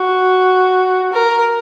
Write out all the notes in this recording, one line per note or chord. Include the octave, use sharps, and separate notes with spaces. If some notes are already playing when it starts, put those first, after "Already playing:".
Already playing: F#4
A#4